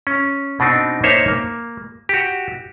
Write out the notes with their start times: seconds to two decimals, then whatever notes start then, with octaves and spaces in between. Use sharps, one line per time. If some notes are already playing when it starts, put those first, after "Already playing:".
0.07 C#4
0.60 B2 C4 D4 D#4
1.03 A#3 D#4 C5 C#5 E5
1.28 A#3
2.09 F#4 G4